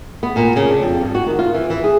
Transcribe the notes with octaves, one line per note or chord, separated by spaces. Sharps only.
B3
A#2
C#3
D4
F2
G2
F#4
D#3
F4
E3
E3
G#4